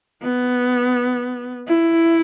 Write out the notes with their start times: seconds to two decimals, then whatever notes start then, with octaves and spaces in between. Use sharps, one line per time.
0.23 B3
1.68 E4